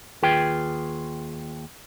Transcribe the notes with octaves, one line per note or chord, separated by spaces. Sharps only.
D#2 F4 G#4 B4 G5